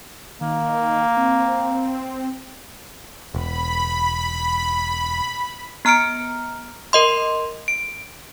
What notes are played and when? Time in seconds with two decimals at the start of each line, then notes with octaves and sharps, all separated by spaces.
0.41 D#3 A#3
1.17 C4
3.34 E1 B5
5.85 B3 A#5 F6 C#7 D7
6.93 A#4 D#5 C6
7.68 D7